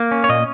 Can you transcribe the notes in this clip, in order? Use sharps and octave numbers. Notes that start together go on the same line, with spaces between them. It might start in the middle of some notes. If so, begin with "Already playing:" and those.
Already playing: A#3
C#4
C#5
A#2 D#5